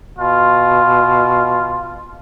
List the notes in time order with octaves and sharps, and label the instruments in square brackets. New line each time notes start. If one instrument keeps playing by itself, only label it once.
[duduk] B2 [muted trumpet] F4